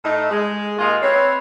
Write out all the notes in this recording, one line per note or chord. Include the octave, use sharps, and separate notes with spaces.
A2 A3 D#4
G#3
D#2 G#3 F4 D#5 F5
C4 E4 B4 C#5